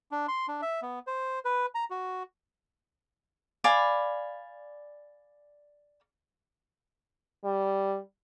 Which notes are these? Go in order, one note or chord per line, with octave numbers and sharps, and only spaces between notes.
D4
C6
D4
E5
B3
C5
B4
A#5
F#4
D5 F5 G#5 B5
G3